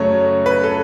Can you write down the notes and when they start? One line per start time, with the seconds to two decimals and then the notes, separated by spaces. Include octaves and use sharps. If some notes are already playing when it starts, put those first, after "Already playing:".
Already playing: F#2 C#3 F#3 A3 C#5
0.46 B4
0.64 A4